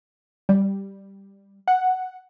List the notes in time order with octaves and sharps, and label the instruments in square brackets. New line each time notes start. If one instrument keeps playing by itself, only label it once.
[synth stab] G3
F#5